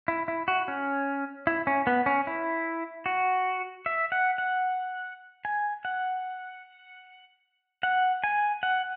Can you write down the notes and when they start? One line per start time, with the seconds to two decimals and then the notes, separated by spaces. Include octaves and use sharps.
0.08 E4
0.28 E4
0.48 F#4
0.68 C#4
1.47 E4
1.67 C#4
1.87 B3
2.06 C#4
2.27 E4
3.06 F#4
3.86 E5
4.12 F#5
4.38 F#5
5.45 G#5
5.85 F#5
7.83 F#5
8.24 G#5
8.63 F#5